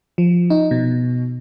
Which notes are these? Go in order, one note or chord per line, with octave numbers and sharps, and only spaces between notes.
F3
D#4
B2